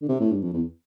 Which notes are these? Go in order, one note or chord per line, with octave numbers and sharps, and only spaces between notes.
D3
C3
A2
G2
F2
E2